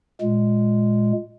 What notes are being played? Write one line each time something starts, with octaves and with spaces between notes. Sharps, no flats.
A#2 G#3